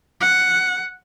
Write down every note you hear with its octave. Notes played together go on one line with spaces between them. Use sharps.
F#5